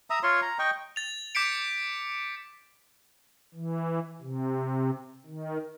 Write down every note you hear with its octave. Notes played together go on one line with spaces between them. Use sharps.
E5 A#5 D#6
F4 C#5 C6
A#5
D#5 G5 C#6
A6 F7
D6 G6 B6 C#7 D7
E3
C3
D#3